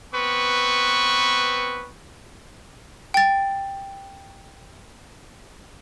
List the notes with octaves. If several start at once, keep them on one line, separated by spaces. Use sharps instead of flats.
B3 C4 B4 C#6
G5 A6